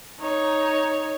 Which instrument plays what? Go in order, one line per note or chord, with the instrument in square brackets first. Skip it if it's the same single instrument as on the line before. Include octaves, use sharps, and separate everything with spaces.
[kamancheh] D#4 C#5